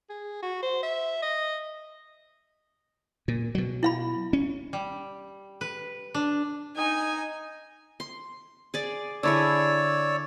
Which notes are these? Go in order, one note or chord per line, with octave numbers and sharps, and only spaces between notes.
G#4
F#4
C5
E5
D#5
A#2
B2 F#3
E4 F5 B5
C#4
G3
B4
D4
D#4 G#5
C6
G#4 D5
D3 E4 G#4 C#5 D5 E6